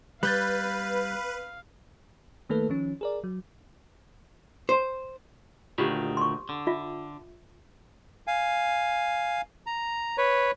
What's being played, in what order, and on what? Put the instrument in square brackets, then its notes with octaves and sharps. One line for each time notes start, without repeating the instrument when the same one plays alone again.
[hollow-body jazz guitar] G3 [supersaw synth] B4 [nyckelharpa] F5 [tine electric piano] F#6 G6 A6
[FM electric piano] D#3 A3 A#3 A4 B4
D#3 F3 C#4
G#4 A#4 D5
F#3
[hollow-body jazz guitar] C5
[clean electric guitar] D2 A#2 D#3 [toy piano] F4 G4
[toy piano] C6 C#6
[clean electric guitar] D3
[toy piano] F4 E5
[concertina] F5 G#5
A#5
B4 C#5